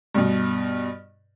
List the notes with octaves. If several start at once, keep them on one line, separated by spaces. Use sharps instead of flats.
G2 B2